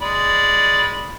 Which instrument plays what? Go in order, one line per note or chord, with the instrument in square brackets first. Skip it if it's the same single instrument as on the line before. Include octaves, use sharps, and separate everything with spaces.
[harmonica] G#3 D5 B5